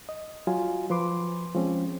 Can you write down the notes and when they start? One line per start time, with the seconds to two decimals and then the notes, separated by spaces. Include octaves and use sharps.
0.09 D#5
0.47 F#3 F4 G#5
0.90 F3 B4 C6 D6
1.55 F3 G#3 C4 C#4